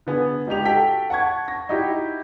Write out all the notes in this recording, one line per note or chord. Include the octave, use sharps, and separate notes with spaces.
D3 B3 G#4
C#2 D#4 G4 F7
F#4 A4 G5 A5 B6
F#5 A5 C#6 G#6
C#6 A#6
D#4 E4 F#4 G4